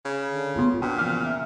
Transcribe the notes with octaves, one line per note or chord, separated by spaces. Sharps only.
C#3
D3
G1 C2 B3 F4
A#2 D4 F#4 G4
E2 C#3 F3 F5
E5